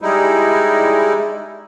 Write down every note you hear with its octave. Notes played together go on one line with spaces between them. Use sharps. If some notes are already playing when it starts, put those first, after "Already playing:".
G3 G#3 D#4 E4